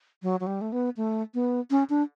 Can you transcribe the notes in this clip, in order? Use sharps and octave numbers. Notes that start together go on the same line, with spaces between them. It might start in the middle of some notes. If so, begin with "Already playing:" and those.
F#3
F#3
G3
A3
B3
A3
B3
C#4
D4